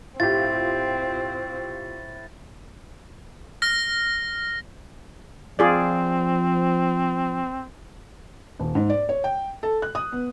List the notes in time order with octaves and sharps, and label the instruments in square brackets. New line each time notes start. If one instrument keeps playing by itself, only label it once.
[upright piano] A2 [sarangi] C4 [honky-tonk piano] F4 G4 [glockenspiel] A6
[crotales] F6 A#6
[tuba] F3 [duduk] C4 [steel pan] F4 G#4 D5
[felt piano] D#1
G#2
D5
C#5
G5
A4
F#6
D#6
B3